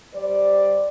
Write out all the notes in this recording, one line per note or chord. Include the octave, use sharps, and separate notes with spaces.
G3 C5 D5